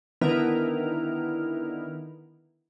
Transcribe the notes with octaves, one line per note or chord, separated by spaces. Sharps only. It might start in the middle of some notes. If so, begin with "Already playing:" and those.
D3 D#3 B3 E4 A#4 F6